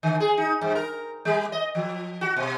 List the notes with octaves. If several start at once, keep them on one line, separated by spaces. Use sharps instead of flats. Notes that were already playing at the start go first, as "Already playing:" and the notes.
D3
G#4
D#4
G2
A#4
G3
D#5
F3
F#4
B2